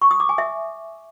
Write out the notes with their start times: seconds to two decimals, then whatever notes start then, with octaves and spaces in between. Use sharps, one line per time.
0.02 C#6
0.11 D#6
0.20 D6
0.29 G#5
0.38 E5